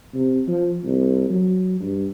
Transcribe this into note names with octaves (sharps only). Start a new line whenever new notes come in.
C3
F3
C2
F#3
G2